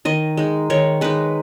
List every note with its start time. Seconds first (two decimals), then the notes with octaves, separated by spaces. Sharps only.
0.05 D#3 D#5
0.37 G#3 D#4
0.70 D#3 C#5
1.01 G#3 D#4 B4